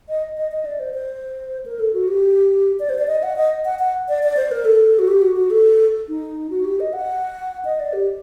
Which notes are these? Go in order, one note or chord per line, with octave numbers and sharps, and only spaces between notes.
D#5
D#5
D#5
D5
C5
C5
A#4
A4
F#4
G4
D5
C5
D5
D#5
F#5
D#5
F#5
F#5
D5
D5
C5
A#4
A4
F#4
G4
F#4
F#4
A4
D#4
F#4
G4
D#5
F#5
D#5
D5
G4